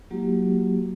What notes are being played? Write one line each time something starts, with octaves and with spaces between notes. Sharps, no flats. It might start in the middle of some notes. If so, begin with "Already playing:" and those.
F#3 G#3 A#3 E4 F#4 G4